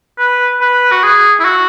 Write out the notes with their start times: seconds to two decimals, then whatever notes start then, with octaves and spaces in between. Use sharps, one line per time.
0.18 B4
0.61 B4
0.92 F#4
1.03 G#4
1.40 E4
1.45 F#4